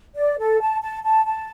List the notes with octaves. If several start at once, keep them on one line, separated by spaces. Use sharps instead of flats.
D5
A4
A5
A5
A5
A5